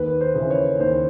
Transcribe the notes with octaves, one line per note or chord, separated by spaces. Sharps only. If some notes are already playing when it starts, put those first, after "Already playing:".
Already playing: D#2 B4
C5
C#3 E3
C#5
D#2 C5